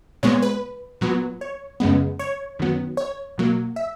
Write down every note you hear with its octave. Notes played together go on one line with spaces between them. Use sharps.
A#2 G#3 B3 C#5
B4
A#2 F#3 B3
C#5
F#2 C#3 G#3 B3
C#5
F#2 D#3 F#3 B3
C#5
B2 F#3 A#3
E5